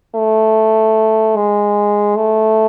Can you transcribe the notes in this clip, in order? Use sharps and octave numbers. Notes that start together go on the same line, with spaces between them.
A3
G#3
A3